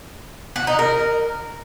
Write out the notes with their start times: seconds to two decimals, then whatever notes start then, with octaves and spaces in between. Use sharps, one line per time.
0.56 F#4
0.67 D#4
0.79 A#4